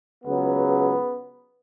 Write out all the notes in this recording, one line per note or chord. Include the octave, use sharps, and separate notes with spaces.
C#2 C#3 F#3 B3